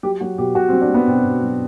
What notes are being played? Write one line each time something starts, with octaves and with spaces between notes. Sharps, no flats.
F#3 G4
F#3 F#4
B2 G4
B2 F#4
C4
F#3
D4
F#3 B3
B2 C4
B2
F#3